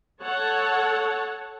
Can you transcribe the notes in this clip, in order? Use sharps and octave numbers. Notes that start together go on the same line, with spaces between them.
A4 C#5 F#5 A5